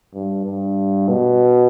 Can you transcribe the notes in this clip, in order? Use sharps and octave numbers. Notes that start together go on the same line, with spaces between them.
G2
G2
B2